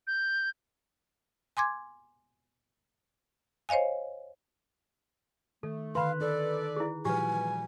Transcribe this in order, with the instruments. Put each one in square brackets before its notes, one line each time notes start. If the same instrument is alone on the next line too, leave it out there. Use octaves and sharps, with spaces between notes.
[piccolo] G6
[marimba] G#5 C6 D6 G#6
C5 C#5 D#5 F5 G#5
[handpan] D#3 [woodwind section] A3 [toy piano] A4
[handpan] D3 D#3 B4 [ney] F5 [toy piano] B5 C6
[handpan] D#4 [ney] A4 [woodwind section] B4 D5
[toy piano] E4 G#4
[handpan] A#2 F3 F#4 [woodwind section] E3 G3 [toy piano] G4 B4 [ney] G#5